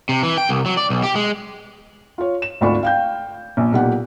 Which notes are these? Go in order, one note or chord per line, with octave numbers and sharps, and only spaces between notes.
C3
E3
G5
C2
F#3
D5
B1
G4
G#3
F4 C#5
E7
G#1 D2 F4 D5 B5 C#6
F5 G5 G6
A#1
B1 A#2 G4 F#5